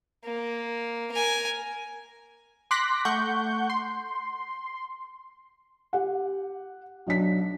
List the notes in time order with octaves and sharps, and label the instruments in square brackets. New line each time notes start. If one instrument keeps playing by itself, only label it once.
[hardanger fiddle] A#3
A#4 G#5
[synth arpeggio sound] C6 D6 F#6 A#6 B6
A3 F#5 C#6 G6
C6
[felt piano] G4 F#5
B1 F#3 D4 B6